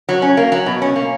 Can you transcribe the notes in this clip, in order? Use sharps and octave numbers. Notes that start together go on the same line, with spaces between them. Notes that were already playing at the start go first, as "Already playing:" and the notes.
F#3
C#4
A#3
F#3
B2
C#4
A#3